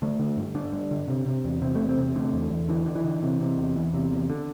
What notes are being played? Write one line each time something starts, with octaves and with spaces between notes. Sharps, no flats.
D3 A3
D3
G2
D3 D4
G2
D3
C3
C3
E2
C3 C4
E2 A3
C4
C3
D3 A3
E2
E2
D3 E3
D3
E3
D3
C3
C3
E2
E2
C3
E2
D3